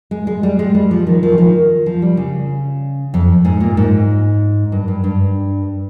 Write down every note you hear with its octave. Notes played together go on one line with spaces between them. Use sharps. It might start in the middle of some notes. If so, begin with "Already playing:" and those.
G#3
G#3
G3
G#3
G3
F3
D#3
F3
D#3
F3
G3
C#3
F2
G#2
A#2
G#2
G2
G2
G2